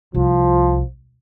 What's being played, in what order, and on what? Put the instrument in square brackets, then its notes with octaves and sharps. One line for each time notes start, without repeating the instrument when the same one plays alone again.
[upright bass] C2 [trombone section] F3